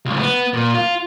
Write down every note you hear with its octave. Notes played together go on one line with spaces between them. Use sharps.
C#2 A2
B3
A#2
F4